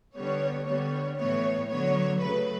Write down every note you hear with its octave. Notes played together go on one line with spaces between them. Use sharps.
D3 G3 B3 C#5
D3 G3 B3 C#5
A2 E3 B3 C#5
D3 F#3 B3 C#5
C#3 F#3 A3 B4